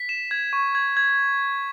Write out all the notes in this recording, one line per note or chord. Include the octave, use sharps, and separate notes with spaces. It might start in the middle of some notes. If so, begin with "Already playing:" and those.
Already playing: B6
E7
G#6
C#6
G#6
G#6